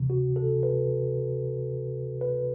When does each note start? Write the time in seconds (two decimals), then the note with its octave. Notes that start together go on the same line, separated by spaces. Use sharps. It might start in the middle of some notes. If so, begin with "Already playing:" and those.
Already playing: D2 C3 E3
0.10 F#4
0.36 A4
0.63 B4
2.21 B4